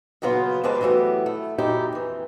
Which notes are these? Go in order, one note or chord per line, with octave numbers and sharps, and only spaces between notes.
A#2 C#3 F#3 B3 F4
E2 G3 G#3 B4 C5 A5
E3 F#3 G3 A3 B3
A3
F#2 A#2 D#4 E4 G4
F2 E3